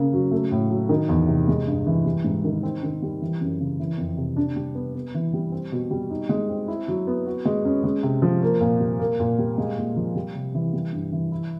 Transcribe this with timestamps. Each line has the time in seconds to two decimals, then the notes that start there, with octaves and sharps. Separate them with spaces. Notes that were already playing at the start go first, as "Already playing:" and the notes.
Already playing: C#3 A#3
0.13 F#3
0.31 A3
0.51 A2
0.70 F#3
0.89 D#3
1.09 E2
1.28 C3
1.48 G#3
1.67 G2
1.87 E3
2.05 G3
2.24 G#2
2.44 D#3
2.63 C4
2.83 D#3
3.02 G3
3.22 E3
3.41 F#2
3.60 C#3
3.80 E3
3.98 F2
4.17 C3
4.36 D4
4.56 G3
4.75 B3
4.95 B3
5.14 E3
5.33 G3
5.52 C4
5.72 B2
5.91 G3
6.10 D#4
6.29 G#3
6.49 C4
6.68 E4
6.88 F#3
7.07 B3
7.26 F#4
7.45 G#3
7.65 C#4
7.84 G#3
8.03 C3
8.22 F3
8.42 A#3
8.61 A#2
8.80 G3
8.99 A#3
9.20 A#2
9.38 G3
9.58 G#3
9.77 A#2
9.96 F3
10.15 G3
10.34 C3
10.55 E3
10.73 G3
10.92 G2
11.12 E3
11.32 E4